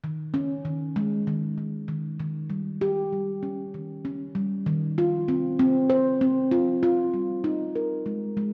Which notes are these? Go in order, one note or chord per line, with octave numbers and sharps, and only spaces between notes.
D#3
C#4
D#3
G#3
D#3
D#3
D#3
D#3
G3
G4
G3
C#4
D#3
C#4
G3
D#3
F4
C4
C4
C5
C4
F4
F4
G3
D#4
A#4
G#3
G#3